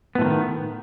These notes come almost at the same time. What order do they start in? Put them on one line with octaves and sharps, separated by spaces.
B3 A2 F3 D#3